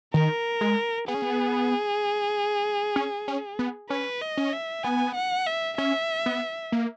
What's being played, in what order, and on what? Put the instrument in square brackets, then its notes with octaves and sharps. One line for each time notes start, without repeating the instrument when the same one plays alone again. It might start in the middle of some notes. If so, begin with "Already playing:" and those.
[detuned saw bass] D#3 [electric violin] A#4
[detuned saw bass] G#3
[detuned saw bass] B3 [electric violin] G#4
[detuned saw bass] C#4
B3
C#4
C#4
B3
[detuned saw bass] C#4 [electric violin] B4
[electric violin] D#5
[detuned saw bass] C#4
[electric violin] E5
[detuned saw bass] B3 [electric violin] G#5
[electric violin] F#5
E5
[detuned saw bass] C#4 [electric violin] E5
[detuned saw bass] B3
A#3